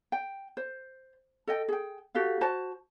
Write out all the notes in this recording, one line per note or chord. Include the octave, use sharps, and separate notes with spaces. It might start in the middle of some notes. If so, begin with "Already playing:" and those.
G5
C5
A4 D#5 G5
G#4 G5
F#4 G4 A4 F5
F#4 C5 A5